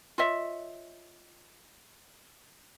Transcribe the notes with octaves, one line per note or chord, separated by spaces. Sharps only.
F4 C#5 D#5 E5